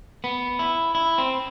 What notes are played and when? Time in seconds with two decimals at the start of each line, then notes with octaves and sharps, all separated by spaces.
0.24 B3
0.59 E4
0.95 E4
1.18 C4